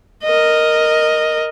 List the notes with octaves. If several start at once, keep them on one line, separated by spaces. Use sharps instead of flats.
A#4 D#5